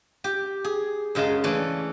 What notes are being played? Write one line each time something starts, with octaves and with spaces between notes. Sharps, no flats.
G4
G#4
F#2 C#3 G#3 D#5 A5
E3 A3 C#4 D5